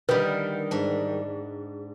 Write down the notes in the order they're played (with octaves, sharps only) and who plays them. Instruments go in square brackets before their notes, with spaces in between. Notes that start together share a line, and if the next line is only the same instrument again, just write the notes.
[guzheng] D3 G4 [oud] D#3 G3 [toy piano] B4
[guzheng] G#2 D4